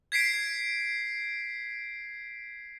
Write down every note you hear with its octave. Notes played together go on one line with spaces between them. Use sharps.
G#6 B6 C7 D7